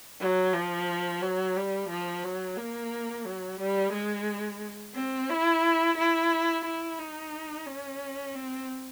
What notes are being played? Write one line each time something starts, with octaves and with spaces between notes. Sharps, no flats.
F#3
F3
F#3
G3
F3
F#3
A#3
F#3
G3
G#3
C4
E4
E4
E4
D#4
C#4
C4